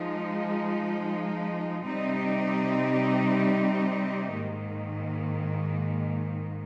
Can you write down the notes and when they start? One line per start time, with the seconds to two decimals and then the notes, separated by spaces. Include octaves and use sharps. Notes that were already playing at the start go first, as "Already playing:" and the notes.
Already playing: F3 G#3 D#4
1.85 C3 G3 C4 D#4 G4
4.34 G#2 D#3 A#3